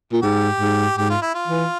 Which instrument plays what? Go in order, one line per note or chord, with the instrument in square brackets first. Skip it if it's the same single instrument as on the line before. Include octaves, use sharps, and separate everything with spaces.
[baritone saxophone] A#2
[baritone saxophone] G#2 [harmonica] G4
[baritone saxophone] G#2
[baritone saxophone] G#2 [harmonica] G4
[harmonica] F4
E4
F4
[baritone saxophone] E3